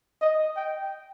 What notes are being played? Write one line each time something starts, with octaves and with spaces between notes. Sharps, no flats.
D#5
G5